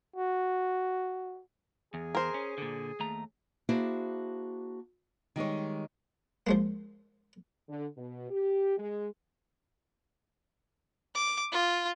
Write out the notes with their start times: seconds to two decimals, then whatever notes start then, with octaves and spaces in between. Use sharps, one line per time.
0.16 F#4
1.94 E2 G#4
2.15 A#4 C5
2.34 C#4
2.58 A#2 D3
3.00 D#2 A3 A#5
3.69 A#3 D4 E4 F#4 G#4 C5
5.36 D#3 G3 G#3 C#5
6.47 F3 G#3 A#3
7.69 D3
7.97 B2
8.30 G4
8.78 G#3
11.15 D6
11.52 F4